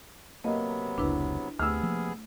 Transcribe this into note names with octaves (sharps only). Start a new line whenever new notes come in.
C3 F#3 A#3 B3 D#5
F1 C#2 D4 E4 B4
D2 C3 A3 B3 G#4 E6 F6
F3 A#3